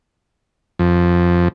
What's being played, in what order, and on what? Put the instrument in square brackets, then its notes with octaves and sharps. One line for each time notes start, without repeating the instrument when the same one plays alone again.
[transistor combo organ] F2